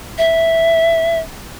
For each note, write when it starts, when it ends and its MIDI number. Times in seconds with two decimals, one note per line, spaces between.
0.18 1.20 76